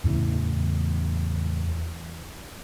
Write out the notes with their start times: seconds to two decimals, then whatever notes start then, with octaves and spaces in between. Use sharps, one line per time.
0.04 E2 A2 C#3 E3